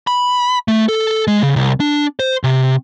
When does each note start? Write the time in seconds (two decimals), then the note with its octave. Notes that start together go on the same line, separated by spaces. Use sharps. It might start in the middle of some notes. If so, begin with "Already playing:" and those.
0.07 B5
0.68 A3
0.89 A4
1.27 G#3
1.43 C#3
1.56 C2
1.80 D4
2.19 C5
2.44 C3